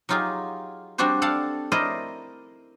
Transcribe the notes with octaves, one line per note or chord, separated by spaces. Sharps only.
F#3 D#4 F4 G4 G#4
G3 C4 D4 F#4 G4 C5
G4 A4 D5 F5 F#5 A5
E4 A#4 C5 D5 D#5